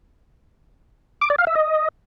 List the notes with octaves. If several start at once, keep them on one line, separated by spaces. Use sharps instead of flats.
D6
D5
F5
E5
D#5